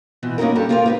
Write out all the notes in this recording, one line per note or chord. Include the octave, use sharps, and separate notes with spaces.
B2 E3 F3
A#3 C#4 D#4 F#4 A#4
G2 G4 A4 A5
A#3 B3 F4 G4 A#4 D5
B3 D#4 B4